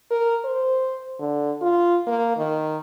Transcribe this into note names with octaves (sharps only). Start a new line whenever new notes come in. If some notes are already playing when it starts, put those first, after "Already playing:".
A#4
C5
D3
F4
A#3
D#3